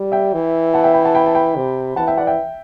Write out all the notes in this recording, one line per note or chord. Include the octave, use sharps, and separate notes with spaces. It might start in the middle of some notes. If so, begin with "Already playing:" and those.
Already playing: G3
E5 G5
E3
F#5 A5
E5 G5
G5 B5
F#5 A5
G5 B5
A5
G5 B5
C3
E3 F#5 A5
E5 G5
D5 F#5
E5 G5